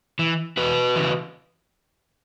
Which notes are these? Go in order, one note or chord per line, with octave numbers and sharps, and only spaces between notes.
E3
E2 F#4 B4
C#3 E3